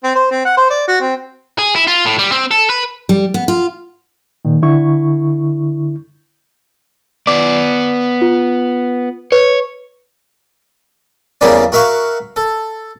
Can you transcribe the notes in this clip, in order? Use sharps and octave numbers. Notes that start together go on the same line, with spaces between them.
C4
C5
C4
F#5
C5
D5
F#4
C4
G#4
E4
F4
A2
G3
C4
A4
B4
G3
B3
F4
A#2 D#3
D3 E4 C#6
B3 D5 D6
F4
B4 C#5
E2 C#3 G3 A#3 C#4 D5
F#4 A#4 E5 F5 C#6
A4